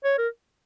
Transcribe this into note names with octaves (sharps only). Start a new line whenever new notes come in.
C#5
A#4